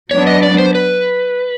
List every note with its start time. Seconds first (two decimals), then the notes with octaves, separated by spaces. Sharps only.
0.11 F#3 B3 D4 C#5
0.27 D#5
0.43 D5
0.59 C5
0.75 B4